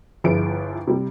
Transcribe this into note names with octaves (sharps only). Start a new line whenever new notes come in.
G1 F3 E4 G#4 B4 D7
C3 G3